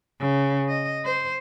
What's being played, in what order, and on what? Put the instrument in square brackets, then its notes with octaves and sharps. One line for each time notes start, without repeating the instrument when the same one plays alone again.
[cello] C#3
D#5
C5